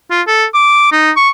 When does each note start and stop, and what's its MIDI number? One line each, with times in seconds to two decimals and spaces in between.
0.11 0.22 65
0.27 0.45 69
0.55 0.92 86
0.92 1.11 63
1.17 1.30 85